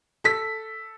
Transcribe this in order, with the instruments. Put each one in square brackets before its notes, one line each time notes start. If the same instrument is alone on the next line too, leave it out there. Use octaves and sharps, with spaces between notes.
[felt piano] A4 B6